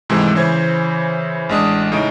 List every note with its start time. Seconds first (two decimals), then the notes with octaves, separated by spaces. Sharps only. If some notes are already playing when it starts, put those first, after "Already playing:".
0.09 G#2 C3 D#3 E3 G#3 A3
0.35 C#3 E3 C5 G#6
1.49 A1 G#3 D4 D#6
1.92 A2 C#3 D#4 D7